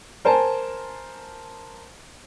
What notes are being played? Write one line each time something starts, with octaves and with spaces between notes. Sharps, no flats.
A#4 C5 G#5 A5